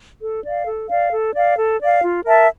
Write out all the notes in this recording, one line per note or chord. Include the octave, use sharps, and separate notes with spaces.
A4
D5 F5
A4
D5 F5
A4
D5 F5
A4
D5 F5
F4
A#4 E5 A5